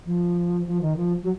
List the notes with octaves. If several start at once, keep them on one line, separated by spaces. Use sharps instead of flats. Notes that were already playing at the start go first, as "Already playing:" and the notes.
F3
F3
D#3
F3
F#3